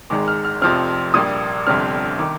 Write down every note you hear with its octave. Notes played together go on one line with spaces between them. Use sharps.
G#1 G#2 D#3 G#3 D6
F6
F6
F1 F2 C3 F3 C4 F6
A#1 A#2 G3 A#3 D#6
G1 F2 C3 G3 C4 F6
D#3 D6